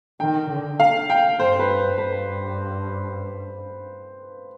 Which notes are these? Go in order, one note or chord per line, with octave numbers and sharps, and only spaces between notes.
D#3 G5
D3
F5
G5
G2 C5
B4
G2 B4